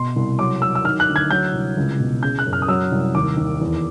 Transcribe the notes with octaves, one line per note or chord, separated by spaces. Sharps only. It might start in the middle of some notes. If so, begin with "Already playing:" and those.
Already playing: B2 C6
C2
F#3 D6
F#3 E6
E6
D#3 F6
F#6
D2
G#6
F#3 G6
C2
C#2
B2
C#3 G6
F#6
F#2
F6
D#6
F#3 E6
C2
D#2 D6
D#2
E2